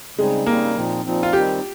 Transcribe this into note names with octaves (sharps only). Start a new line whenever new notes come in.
C#3 G3 G#3 C4 D#4
C#3 G3 A#3 C4 D#4
A#2 F3 C4 D#4
A#2 F3 C4 D#4
F4
D#3 G3 C4 D#4 G4